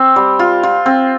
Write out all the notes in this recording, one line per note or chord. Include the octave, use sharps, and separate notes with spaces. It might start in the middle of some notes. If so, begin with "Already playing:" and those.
Already playing: C4
G3
F4
F4
C4